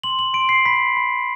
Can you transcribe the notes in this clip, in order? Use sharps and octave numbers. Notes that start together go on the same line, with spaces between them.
C6 F#7
F#7
C6 D7
C7
B5 B6
B5